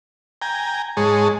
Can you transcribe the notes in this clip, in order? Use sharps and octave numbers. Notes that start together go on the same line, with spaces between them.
G5 G#5 A#5
G#2 G#3 G#4 C#5 A5